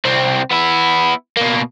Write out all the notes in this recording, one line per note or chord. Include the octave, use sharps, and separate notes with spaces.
C2 C4
B3 E4
B2 A#3